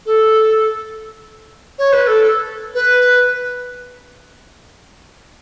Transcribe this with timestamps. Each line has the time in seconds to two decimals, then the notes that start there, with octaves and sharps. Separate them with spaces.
0.06 A4
1.79 C#5
1.93 B4
2.07 A4
2.75 B4